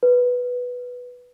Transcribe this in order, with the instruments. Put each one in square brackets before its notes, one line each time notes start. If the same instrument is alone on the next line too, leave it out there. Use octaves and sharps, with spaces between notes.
[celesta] B4